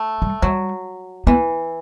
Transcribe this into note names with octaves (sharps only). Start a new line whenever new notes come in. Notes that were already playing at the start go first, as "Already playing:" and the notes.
Already playing: A3
G3
F#3 G3
E3 B3